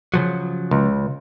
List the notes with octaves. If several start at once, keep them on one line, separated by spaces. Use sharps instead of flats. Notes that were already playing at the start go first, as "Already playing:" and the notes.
C#3 F3 F#3
C#2